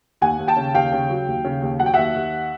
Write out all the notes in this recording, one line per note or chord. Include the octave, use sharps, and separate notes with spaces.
D#2 F#5 G#5
D#2
G5 A5
C#3
D#2 F5 G5
C#3
F#3
D#2
C#3
D#2
F#3 F#5
G5
D#2 E5 F#5
D#2